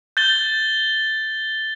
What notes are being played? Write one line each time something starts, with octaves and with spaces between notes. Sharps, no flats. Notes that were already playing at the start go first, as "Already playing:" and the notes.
G6 A6 G7